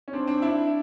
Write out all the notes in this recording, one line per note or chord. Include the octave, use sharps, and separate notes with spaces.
C#4
C4 D4
C4 D4
D4 E4